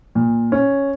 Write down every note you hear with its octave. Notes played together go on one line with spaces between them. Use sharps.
A#2
C#4